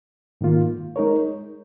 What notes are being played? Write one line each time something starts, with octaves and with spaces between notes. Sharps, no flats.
G#2 D#3 A#3 F4
G#3 D#4 A#4 C#5